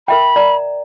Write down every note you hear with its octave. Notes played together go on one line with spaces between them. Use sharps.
A#4 E5 G5 B5
D5 A#5